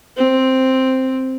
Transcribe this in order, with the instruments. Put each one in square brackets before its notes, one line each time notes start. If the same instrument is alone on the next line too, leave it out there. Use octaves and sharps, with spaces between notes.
[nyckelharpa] C4